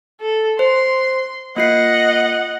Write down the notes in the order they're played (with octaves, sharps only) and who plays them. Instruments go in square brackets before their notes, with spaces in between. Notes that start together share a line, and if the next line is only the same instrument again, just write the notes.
[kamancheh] A4
[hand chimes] C5 [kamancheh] C6
[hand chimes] A#3 F4 C7 [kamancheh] D#5 F#5